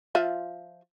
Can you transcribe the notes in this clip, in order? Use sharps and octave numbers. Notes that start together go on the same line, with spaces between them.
F3 F4 E5